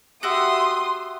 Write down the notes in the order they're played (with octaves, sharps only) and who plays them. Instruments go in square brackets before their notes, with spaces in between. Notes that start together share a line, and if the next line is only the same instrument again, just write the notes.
[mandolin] F#4 G4 E5 [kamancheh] C6 D#6